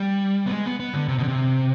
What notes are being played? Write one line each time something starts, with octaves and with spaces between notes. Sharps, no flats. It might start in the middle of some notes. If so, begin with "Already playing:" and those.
Already playing: G3
B3
G#3
B3
B3
D3
C3
B2
D3
C3